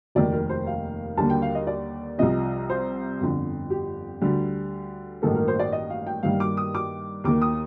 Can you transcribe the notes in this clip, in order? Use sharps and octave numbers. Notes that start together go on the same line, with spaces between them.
F1 D#2 D#3 D5
A#4
C5
F5
D#2 D3 G3 A#3 A5
G5
F5
D#5
D5
C2 C3 F3 D#5
C5
G1 F2 D3
G4
D2 D3 G3
A1 G2 D#3 A#3 A4
A#4
C5
D5
D#5
F5
G5
G2 D#3 G3 A#3 F5
D6
D#6
D6
D#2 D#3 A#3 D6
D#6